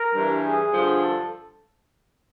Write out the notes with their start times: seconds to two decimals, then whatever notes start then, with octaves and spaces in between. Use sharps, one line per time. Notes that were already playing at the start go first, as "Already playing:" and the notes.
Already playing: A#4
0.15 G2 E3
0.44 G#4
0.73 G2 D3 F3
1.00 A4